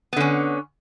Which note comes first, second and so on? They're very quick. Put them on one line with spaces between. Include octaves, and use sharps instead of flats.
B3 D3 C#4